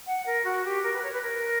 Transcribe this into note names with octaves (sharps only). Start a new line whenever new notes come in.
F#5
A#4
F#4
G4
A#4
B4
C#5
B4
A#4